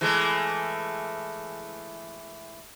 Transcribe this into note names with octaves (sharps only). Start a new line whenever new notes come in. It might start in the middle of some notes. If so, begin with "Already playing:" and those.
E3 G#3 A3